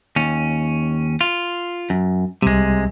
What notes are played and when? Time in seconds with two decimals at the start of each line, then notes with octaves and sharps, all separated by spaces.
0.16 D#2 C#4
1.21 F4
1.90 F#2
2.42 C2 C3 G3 G#3